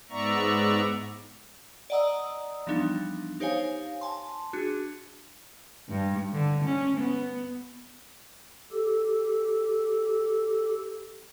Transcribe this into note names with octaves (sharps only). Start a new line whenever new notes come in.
G#2 B3 D5 E5 A#5 C#6
D5 D#5 F#5 A#5 D#6 E6
E3 F3 G3 B3 D4 D#4
D#4 G4 C5 C#5 F5 G#5
G#5 A5 C6
D4 F#4 G#4
G2
D3
C#4
B3
G4 A4